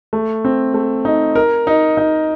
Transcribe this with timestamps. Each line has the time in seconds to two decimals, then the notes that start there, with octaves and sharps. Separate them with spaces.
0.13 A3
0.45 C4
0.74 A3
1.05 D#4
1.35 A#4
1.67 D#4
1.97 D#4